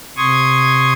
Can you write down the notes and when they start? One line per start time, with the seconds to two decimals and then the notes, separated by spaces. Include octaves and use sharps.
0.17 C3 C6 C#6 D#6 G#6